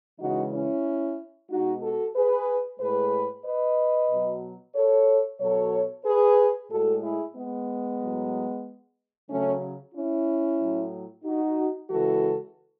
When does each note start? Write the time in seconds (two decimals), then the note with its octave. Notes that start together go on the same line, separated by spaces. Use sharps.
0.20 C#3 E3 G#3 D#4 F#4
0.52 C#4 E4
1.50 B2 G#3 D#4 F#4
1.82 F#4 A4
2.15 G#4 B4
2.80 A2 G#3 G#4 B4
3.45 B4 D#5
4.10 B2 F#3
4.75 A4 C#5
5.40 B2 F#3 A4 C#5
6.05 G#4 B4
6.70 A2 G#3 F#4 A4
7.02 E4 G#4
7.35 G#3 B3
8.00 A2 F#3
9.29 C#3 F#3 A3 C#4
9.94 C#4 E4
10.60 A2 F#3
11.25 D#4 F#4
11.89 C#3 E3 G#3 F#4 A4